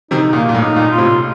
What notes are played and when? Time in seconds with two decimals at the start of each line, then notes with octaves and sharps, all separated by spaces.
0.11 C3 D#3 D#4
0.33 A#2 A#3
0.49 A#2
0.55 A2
0.62 D#4
0.76 A#2
0.91 F4
0.98 A2 C3